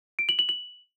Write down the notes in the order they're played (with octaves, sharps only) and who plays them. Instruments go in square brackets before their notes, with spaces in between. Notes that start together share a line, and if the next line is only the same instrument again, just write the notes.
[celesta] D7
F#7
F#7
F#7